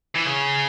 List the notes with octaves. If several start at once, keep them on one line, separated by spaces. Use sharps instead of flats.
E3
C#3